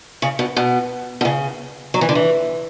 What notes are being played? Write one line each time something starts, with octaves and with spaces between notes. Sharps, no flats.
C#3
B2
B2
B2
C#3
F#3
E3
D3
E3